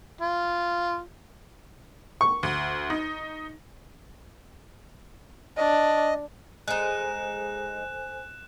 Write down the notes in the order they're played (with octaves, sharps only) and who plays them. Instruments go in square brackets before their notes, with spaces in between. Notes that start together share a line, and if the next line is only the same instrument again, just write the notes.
[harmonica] F4
[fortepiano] C#6
[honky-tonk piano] D2
D#4
[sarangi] D4 [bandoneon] D#5
[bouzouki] G#3 D#4 [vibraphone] A4 C5 G#5 [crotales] F#6 E7